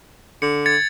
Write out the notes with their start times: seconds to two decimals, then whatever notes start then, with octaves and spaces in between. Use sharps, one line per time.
0.42 D3 C#7
0.66 G#6 A6 C#7